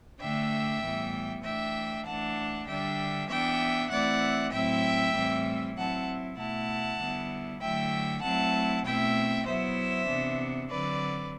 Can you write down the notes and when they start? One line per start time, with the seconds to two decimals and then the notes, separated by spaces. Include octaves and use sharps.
0.21 D3 A3 D4 E5 G5
0.81 A2 E3 G3 B3
1.43 E3 A3 D4 E5 G5
2.05 E3 A3 D4 F#5 A5
2.67 D3 G3 D4 E5 G5
3.28 E3 B3 D4 E5 G5
3.90 E3 A3 C4 E4 D5 F#5
4.52 A2 F#3 C4 E4 E5 G5
5.15 A2 E3 G3 C4 E4
5.76 F#3 C4 E4 F#5 A5
6.37 B2 A3 E4 F#5 A5
6.99 D3 G3 B3 E4
7.61 D3 F#3 A3 E4 E5 G5
8.22 F#3 A3 C4 E4 F#5 A5
8.85 B2 A3 C4 E4 E5 G5
9.46 F#3 B3 E4 C5 E5
10.08 C3 E3 B3 D4
10.70 D3 F#3 C4 B4 D5